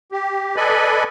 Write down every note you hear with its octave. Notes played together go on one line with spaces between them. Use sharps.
G4
A4 B4 D5 D#5 G#5 B5